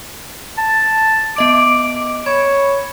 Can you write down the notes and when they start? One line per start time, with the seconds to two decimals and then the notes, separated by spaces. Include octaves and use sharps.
0.58 A5
1.36 B3 D#5 D6 D7
2.26 C#5 B5